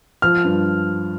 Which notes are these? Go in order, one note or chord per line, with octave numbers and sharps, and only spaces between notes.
F3 F6
G2